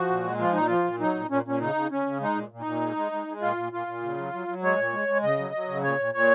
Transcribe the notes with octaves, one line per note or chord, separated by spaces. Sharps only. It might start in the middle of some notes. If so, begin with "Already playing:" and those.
Already playing: F3 F#4
A#2
G#3
F3 F4
A#2 D#4
F3 F4
A#2
F#3 D#4
A#2
A#2 C#4
A#2 C#4
C#3 D#4
C#3
C#3 C#4
C#3
G#3 D#4
A#2
A#2
D#4
A#2
G#3
G#3
G#3
G#3
A#2 F4
A#2
A#2 F4
A#2
C#3
F#3
F#3
F#3
G#3 C#5
A#2
G#3
G#3
C#3 D#5
F#3
F#3
C#3
A#2 C#5
A#2
A#2 C#5